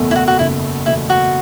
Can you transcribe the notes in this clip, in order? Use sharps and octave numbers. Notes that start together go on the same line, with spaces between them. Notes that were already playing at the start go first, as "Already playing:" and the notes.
Already playing: F#1 E2 B2 A3
E4
F#4
F#4
F#1 E4
E2 B2 A3 E4
F#4